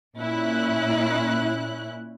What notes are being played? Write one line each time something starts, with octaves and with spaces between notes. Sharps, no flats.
A#2 C#4 E4 F#6